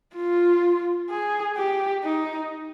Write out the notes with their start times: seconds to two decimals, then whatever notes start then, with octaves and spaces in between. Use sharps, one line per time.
0.16 F4
1.10 G#4
1.57 G4
2.04 D#4